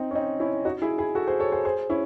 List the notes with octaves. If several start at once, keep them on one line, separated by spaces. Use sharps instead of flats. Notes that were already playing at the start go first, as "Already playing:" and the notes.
Already playing: C4 D#4
C#4
C4 D#4
C#4 E4
D#4 F#4
E4 G#4
E4 G#4
F#4 A4
G#4 C5
A4 C#5
G#4 C5
G#4 C5
C#4 E4